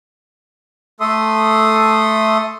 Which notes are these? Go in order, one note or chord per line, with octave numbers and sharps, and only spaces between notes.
A3 A4 E5 C6 D#6